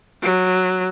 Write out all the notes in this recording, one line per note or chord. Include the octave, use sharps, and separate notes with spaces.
F#3